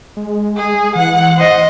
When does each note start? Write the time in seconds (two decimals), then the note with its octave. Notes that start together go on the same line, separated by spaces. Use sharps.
0.16 G#3
0.57 G#4
0.95 E3 F#5
1.37 C5 D#5